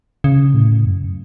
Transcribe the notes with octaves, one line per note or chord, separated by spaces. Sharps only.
C#3
A2
F#2